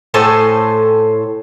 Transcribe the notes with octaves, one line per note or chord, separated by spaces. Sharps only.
A2 A4 C5 G#5